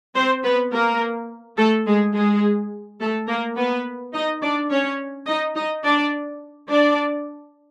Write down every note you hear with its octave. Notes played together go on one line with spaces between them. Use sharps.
C4 C5
B3 B4
A#3 A#4
A3 A4
G#3 G#4
G#3 G#4
A3 A4
A#3 A#4
B3 B4
D#4 D#5
D4 D5
C#4 C#5
D#4 D#5
D#4 D#5
D4 D5
D4 D5